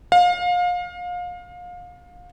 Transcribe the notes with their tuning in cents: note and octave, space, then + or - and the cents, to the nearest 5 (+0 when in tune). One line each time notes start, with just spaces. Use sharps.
F5 +30